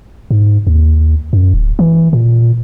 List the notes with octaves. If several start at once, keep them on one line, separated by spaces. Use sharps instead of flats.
G#2
D#2
F#2
D1
E3
A#2